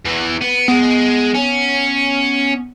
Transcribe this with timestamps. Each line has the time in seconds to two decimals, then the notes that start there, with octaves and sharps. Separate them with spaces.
0.05 E2 E3
0.41 B3
0.68 G#3 B3
1.35 C#4